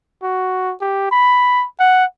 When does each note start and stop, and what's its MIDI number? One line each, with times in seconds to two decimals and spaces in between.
0.23 0.74 66
0.81 1.08 67
1.11 1.65 83
1.80 2.04 78